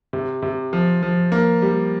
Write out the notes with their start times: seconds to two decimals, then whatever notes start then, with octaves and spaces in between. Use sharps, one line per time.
0.13 C3
0.42 C3
0.73 F3
1.03 F3
1.32 A#3
1.62 G3